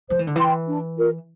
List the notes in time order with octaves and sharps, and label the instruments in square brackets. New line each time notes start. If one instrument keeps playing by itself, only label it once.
[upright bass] F3 [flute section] C5
[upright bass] E3
D3
[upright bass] E3 [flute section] G5 C6
[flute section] D4
F4 A#4